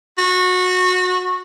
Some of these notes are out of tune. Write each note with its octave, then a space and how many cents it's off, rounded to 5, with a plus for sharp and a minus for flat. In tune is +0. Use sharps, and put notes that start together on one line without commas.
F#4 -20